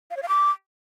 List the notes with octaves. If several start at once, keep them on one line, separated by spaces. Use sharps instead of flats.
F5
C#5
F5
D6